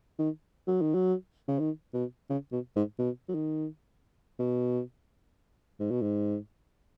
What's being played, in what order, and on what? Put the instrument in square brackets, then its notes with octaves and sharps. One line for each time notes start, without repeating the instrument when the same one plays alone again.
[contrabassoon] D#3
F#3
D#3
F#3
C#3
D#3
B2
C#3
B2
G#2
B2
F#3
D#3
B2
G#2
B2
G#2